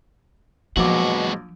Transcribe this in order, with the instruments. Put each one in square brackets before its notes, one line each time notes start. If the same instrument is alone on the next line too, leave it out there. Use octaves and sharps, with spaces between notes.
[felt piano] A#1 F#3 D6 [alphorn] B2 [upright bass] F3 [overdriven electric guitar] G#3 F#4